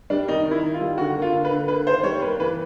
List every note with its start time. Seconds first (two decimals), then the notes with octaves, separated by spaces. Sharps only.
0.10 G3 D4
0.28 D#3 D#4
0.45 D#3
0.51 E4
0.62 D#3
0.74 F4
0.80 G3
0.98 D3 F#4
1.16 A#3
1.22 F4
1.33 D3
1.45 B4
1.51 D3
1.68 A#3 B4
1.87 D#3 C5
2.03 G3 C#5
2.22 A#3 B4
2.40 E3 B4